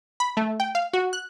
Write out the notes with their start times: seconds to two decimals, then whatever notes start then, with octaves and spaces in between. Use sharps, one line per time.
0.20 B5
0.37 A3
0.60 G5
0.75 F5
0.93 F#4
1.13 F#6